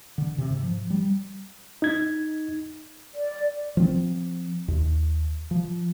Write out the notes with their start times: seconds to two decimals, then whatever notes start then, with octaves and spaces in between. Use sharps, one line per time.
0.18 D3
0.38 C3
0.50 G#2
0.63 F3
0.90 G3
1.82 D#4 G#6
3.15 D5
3.77 F3 C4
4.68 D#2
5.51 F3